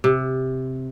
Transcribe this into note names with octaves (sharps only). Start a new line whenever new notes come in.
C3